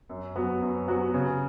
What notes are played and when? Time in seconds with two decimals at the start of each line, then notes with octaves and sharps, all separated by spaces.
0.09 F#2
0.36 F#3 B3 F#4
0.61 F#2
0.88 F#3 B3 F#4
1.14 C#3